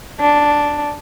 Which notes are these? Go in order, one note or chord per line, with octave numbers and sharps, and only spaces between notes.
D4